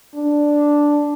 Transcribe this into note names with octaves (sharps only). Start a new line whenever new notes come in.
D4